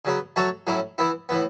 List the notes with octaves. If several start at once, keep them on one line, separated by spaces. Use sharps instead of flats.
C#3 F#3 B3
F#3 A3 F#4 A4 C#5
A2 F#3 C#4 E4
E3 B3 E4
A2 E3 B3